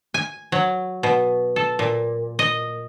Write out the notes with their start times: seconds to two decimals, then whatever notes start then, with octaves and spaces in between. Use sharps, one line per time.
0.14 G#5
0.52 F#3
1.03 B2
1.56 A4
1.79 A#2
2.39 D#5